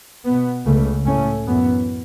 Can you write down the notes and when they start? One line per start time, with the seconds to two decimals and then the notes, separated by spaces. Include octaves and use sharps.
0.25 B2 B3
0.66 C#2 C#3 A3
1.06 A2 A3 C#4
1.47 F#2 E3 B3